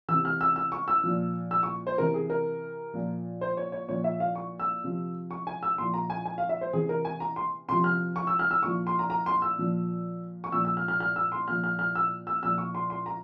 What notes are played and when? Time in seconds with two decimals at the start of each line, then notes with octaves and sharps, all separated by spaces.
0.08 C3 E3 E6
0.25 F6
0.41 E6
0.56 E6
0.72 C#6
0.88 E6
1.04 A#2 F3
1.51 E6
1.63 C#6
1.87 C5
1.98 C3 E3 A#4
2.14 G#4
2.30 A#4
2.94 A#2 F3
3.41 C5
3.57 C#5
3.72 C#5
3.88 A#2 F3 C#5
4.04 E5
4.20 F5
4.35 C#6
4.60 E6
4.83 C3 F3
5.31 C#6
5.47 G#5
5.63 E6
5.78 A#2 F3 C6
5.94 A#5
6.10 G#5
6.26 G#5
6.38 F5
6.49 E5
6.61 C5
6.73 C3 E3 G#4
6.89 A#4
7.05 G#5
7.20 A#5
7.36 C6
7.68 C3 F3 C6
7.84 F6
8.16 C#6
8.27 E6
8.39 F6
8.51 E6
8.63 A#2 F3 C#6
8.87 C6
8.99 A#5
9.10 A#5
9.26 C6
9.42 E6
9.58 A#2 F3
10.44 C#6
10.52 A#2 F3 E6
10.65 E6
10.77 F6
10.88 F6
11.00 F6
11.16 E6
11.32 C6
11.48 A#2 F3 F6
11.64 F6
11.79 F6
11.95 E6
12.27 E6
12.43 A#2 F3 E6
12.58 C#6
12.75 C6
12.90 C6
13.06 A#5